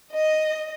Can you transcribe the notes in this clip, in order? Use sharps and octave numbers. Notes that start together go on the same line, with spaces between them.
D#5